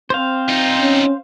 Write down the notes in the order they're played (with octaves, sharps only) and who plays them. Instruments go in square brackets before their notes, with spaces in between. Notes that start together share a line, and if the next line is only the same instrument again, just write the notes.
[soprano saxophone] C4 [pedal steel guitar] C5 F5
[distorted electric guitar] D#4 F4
[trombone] C#4